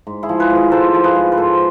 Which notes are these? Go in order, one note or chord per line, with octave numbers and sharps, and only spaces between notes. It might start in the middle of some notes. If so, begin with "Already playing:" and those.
G#2
E4 G#4
F3
G#4 B4
G#2
G#4 B4
G#2 A4 C5
F3
G#4 B4
G#2
B4
G#2 A4 C5